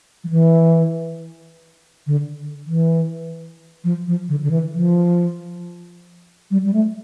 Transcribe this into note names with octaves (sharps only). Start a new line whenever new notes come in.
F3
E3
D3
E3
F3
F3
D3
D3
E3
F3
G3
G3
A3